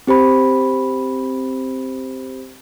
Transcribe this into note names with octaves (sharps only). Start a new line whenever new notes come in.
C4 G4 C5 B5